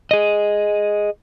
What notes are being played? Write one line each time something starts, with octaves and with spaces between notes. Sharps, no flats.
G#4 D#5